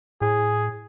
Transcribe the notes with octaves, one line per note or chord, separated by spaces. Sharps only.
A2 G#4